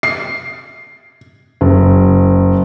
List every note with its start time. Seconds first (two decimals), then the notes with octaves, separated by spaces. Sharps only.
0.03 C7
1.61 F#1